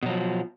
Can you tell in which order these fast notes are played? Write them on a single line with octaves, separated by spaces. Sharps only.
B2 F#3 F3